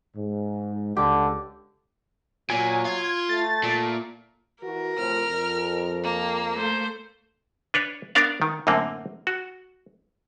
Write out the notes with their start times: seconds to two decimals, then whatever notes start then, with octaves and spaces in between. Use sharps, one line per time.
0.16 G#2
0.97 C#2 D3 G4
2.50 A#2 F#3 G#5
2.85 F4 G#6
3.29 A3 A6
3.64 A#2
4.63 E3 F#4 A#4
4.98 A2 C3 F3 F6
5.30 F2
6.04 A#3
6.55 A3 C5
7.74 D4 B4 C#5
8.15 B3 D4 A#4 D5 F5
8.42 D#3
8.67 F#2 A2 D3 A#3 C4
9.27 F#4